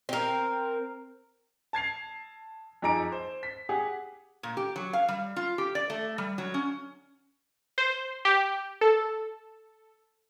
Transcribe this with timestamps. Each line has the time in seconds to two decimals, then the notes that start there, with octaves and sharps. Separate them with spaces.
0.09 C4 A#4
1.73 A5 G#6 C7 F7
2.82 F2 D#4 G#4 A#5 D6 D7
3.12 C5
3.43 B6
3.69 G4 G#4 F#5
4.43 A#2
4.57 G4
4.76 F#3
4.93 F5
5.09 G3
5.36 F4
5.58 G4
5.75 D5
5.90 A3
6.18 G3
6.38 F#3
6.54 C#4
7.78 C5
8.25 G4
8.81 A4